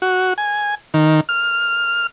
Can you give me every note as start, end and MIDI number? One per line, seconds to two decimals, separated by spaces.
0.02 0.33 66
0.38 0.75 80
0.94 1.20 51
1.29 2.07 89